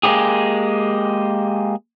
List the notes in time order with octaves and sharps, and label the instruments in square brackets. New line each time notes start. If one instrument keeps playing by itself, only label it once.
[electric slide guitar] G#3 A#3 C#4 D#4 G4 G#4